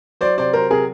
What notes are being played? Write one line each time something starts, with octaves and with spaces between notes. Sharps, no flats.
F#3 C5 D5
C3 C5 D5
F#3 A#4 C5
C3 G#4 A#4